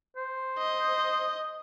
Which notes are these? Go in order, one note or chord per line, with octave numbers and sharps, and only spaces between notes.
C5
D#5